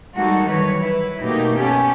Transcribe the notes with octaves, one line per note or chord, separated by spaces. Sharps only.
G3 G#3 A#3 D#4 F#4 A4
D#3 E3 F#3 G3 B4 C#5
E4 B4
B2 A3 A#3 D#4 G4
B3 C#4 G4 A4